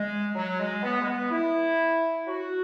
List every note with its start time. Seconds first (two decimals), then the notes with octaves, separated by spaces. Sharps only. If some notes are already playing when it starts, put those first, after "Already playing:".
Already playing: G#3
0.35 F#3
0.59 G#3
0.83 B3
1.01 G#3
1.07 B3
1.31 E4
2.27 F#4